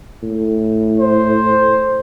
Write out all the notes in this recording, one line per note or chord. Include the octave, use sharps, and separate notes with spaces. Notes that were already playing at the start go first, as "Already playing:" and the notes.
A2
C5